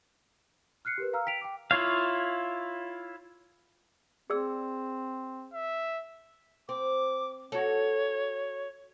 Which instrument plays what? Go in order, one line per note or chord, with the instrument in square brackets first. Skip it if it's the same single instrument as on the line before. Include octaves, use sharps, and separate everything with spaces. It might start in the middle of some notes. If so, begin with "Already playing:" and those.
[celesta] F6 F#6 C7 C#7
G4 A#4 B4
F5 A#5 E6 F6
G5 B6 D7 F7
G5 D6
[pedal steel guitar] E4 F4 C#5 F5
[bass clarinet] C4 [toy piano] G#4 D5 E6
[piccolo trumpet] E5
[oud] C4 [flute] D6
[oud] F#4 A4 [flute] C#5